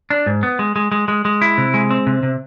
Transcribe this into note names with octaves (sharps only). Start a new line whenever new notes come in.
D4
G#2
B3
G#3
G#3
G#3
G#3
G#3
E4
C3
G#3
C4
C3
C3